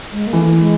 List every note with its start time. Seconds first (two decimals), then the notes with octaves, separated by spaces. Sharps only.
0.12 G#3
0.27 A#3
0.33 E3 A3
0.59 G#3